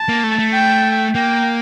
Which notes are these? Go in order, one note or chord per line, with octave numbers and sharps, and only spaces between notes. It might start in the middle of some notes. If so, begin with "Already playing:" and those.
Already playing: A5
A#3
A3
A3
G5
A#3 G5